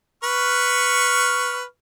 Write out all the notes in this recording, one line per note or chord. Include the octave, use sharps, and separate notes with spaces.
B4 C#6 F6